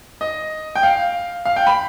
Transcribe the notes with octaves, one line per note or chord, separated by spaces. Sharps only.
D#5
G5
F5
F5
G5
B5